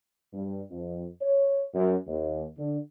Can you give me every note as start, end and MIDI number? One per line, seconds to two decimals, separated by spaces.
0.33 0.61 43
0.71 1.07 41
1.22 1.65 73
1.74 1.95 42
2.08 2.45 39
2.57 2.79 50